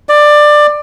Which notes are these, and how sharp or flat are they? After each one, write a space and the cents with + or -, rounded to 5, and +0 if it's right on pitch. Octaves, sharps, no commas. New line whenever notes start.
D5 +15